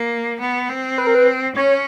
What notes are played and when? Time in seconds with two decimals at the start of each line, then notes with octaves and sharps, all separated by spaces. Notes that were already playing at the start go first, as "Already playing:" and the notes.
Already playing: A#3
0.40 B3
0.69 C4
0.98 B4
1.07 A#4
1.15 B4
1.55 C#4 C#5